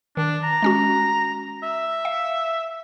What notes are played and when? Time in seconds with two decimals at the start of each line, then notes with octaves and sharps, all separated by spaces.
0.17 D#3 D4
0.44 A#5
0.62 G#3 C#4 F#4
1.63 E5
2.05 F5